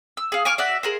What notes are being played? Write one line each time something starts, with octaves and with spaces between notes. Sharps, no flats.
E6
G#4 F5
G#5 C#6 D6 F6
F#4 D5 E5
G#4 A#4 C5